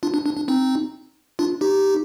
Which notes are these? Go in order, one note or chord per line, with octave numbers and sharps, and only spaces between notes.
D4 F4
D4
D4
D4
C4 D#4
D4 F4
D#4 G4